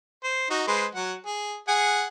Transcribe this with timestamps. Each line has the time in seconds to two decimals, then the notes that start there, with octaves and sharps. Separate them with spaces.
0.24 C5
0.50 D#4 F#4
0.67 G#3 B4 C5
0.95 F#3 F#5
1.25 G#4
1.68 G#4 F#5 G#5